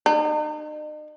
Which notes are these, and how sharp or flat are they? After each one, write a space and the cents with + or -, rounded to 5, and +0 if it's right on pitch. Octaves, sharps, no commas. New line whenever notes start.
D#4 -40